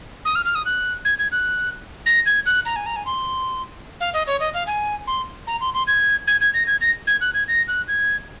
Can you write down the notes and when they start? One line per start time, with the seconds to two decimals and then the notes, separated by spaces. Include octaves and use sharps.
0.25 D#6
0.35 F6
0.45 F6
0.55 D#6
0.66 F#6
1.05 G#6
1.19 G#6
1.32 F#6
2.06 A#6
2.26 G#6
2.46 F#6
2.66 A#5
2.76 G#5
2.86 A#5
2.96 G#5
3.06 C6
4.00 F5
4.14 D#5
4.27 C#5
4.40 D#5
4.54 F5
4.67 G#5
5.07 C6
5.47 A#5
5.61 C6
5.74 C6
5.87 G#6
6.27 G#6
6.41 G#6
6.54 A#6
6.67 G#6
6.81 A#6
7.07 G#6
7.21 F#6
7.34 G#6
7.48 A#6
7.68 F#6
7.88 G#6